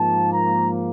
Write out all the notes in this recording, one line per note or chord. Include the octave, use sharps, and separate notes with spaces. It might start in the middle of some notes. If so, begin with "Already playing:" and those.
Already playing: G#2 F3 A#3 A5
A#5